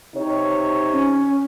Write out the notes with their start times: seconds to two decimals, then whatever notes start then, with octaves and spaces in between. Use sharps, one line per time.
0.15 C3 D#4 C#5
0.92 C#4